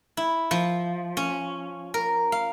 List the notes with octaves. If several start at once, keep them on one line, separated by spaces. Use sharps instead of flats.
E4
F3
C#4
A#4
F5